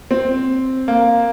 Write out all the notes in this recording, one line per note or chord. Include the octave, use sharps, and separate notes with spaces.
C4
A#3